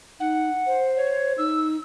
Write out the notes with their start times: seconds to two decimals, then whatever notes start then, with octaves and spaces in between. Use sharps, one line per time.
0.20 D#4 F#5
0.67 C5
0.96 C#5
1.38 D#4 E6